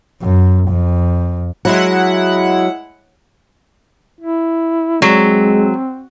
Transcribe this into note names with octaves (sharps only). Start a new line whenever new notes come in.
F#2
F2
F#3 G#3 E4 F#5
E4
F#3 G#3 C4